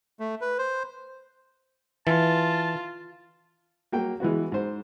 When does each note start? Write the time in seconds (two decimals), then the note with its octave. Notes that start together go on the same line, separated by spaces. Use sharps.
0.20 A3
0.41 B4
0.58 C5
2.07 E3 F4 A5
3.92 F#3 A#3 G5
4.20 E3 G#3 B3 F#4
4.52 G#2 C5